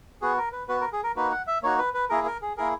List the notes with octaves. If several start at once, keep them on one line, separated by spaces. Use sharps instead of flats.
B3 F#4 G#4
A#4
B4
B3 F#4 B4
A#4
G#4
A#4
A#3 D#4 F#4 B4
F#5
E5
A#3 D#4 F#4 C#5
B4
B4
A#3 E4 G#4 A#4
A#4
G#4
A#3 E4 G#4 A#4